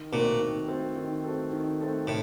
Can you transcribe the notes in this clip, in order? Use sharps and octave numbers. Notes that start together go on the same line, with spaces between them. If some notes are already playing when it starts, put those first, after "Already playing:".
Already playing: D#3
A#2 A3 C4 F#4 A4
D#3
A3 C4 F#4 A4
D#3
A3 C4 F#4 A4
D#3
A3 C4 F#4 A4
A2